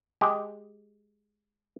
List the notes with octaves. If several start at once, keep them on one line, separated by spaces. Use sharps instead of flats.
G#3 G4